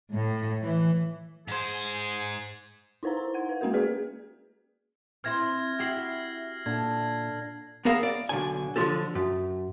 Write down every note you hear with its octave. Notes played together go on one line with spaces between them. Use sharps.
A2
E3
G#2 G#4 C5
D#4 E4 B4 C5 A#5
A#5
F#5 G#6
B4
G#3 A#3 C#4 F#4 A#4
A#3 G#4 B4 D5
C4 E4 C5 F6 G#6 A#6
E4 F#4 G4 G#6 C7 F#7
A#2 D3 G#6
B3 G#4 A#4 E5 F5
D5
B1 D3 G#5
D3 F3 F#3 F4 G4 A4
F#2